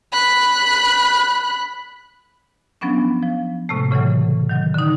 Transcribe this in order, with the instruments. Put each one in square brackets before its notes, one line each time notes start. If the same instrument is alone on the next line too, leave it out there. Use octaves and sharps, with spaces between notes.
[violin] B5 F#6
[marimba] F3 F#3 B3 C#4 D4
F3
A2 C3 G#3 A3
A2 C#3 E3 F#3
D#3 F#3
D3 D#4